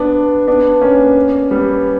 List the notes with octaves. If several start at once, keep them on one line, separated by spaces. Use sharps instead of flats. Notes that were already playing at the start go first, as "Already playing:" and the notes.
Already playing: B3 D4
B3 D4
A#3 C#4
G3 B3